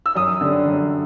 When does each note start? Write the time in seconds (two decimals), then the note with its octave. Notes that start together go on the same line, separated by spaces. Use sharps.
0.06 E6
0.15 F#2 D#6
0.41 D3 G3
0.67 F#2